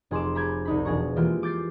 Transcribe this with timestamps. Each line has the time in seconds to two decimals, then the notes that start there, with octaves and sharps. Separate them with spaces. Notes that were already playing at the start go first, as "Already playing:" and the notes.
0.11 F1 G#4 C6 D6 E7
0.35 A#5 B5 D6 G6 G#6
0.65 C2 D#4 B5
0.85 E1 B2 G#4 A#5 C#6
1.16 E3 G#3 A#3 F4 G4
1.43 D6 G6 A6 C7